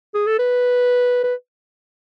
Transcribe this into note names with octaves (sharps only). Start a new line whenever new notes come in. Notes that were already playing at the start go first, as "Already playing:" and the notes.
G#4
A4
B4
B4